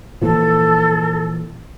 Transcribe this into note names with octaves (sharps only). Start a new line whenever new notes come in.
A#2 E3 F3 A4